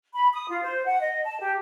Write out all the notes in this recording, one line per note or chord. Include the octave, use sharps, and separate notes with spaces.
B5
D#6
F4
C5
F#5
D#5
A5
G4